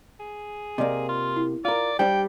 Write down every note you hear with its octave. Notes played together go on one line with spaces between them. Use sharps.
G#4
C3 A#3 D5 D#5
F4
E4
F4 A#4 D5
G3 D4 G4 C5 D5 G5